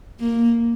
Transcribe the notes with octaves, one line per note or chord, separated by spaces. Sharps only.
A#3